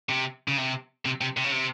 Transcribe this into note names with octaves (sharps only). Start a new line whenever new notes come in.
C3
C#3
C3
C3
C3
C3
C#3
C3